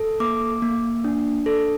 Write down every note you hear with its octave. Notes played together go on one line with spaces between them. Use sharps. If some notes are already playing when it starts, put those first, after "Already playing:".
Already playing: A4
A#3 D6
A#3
D4
A4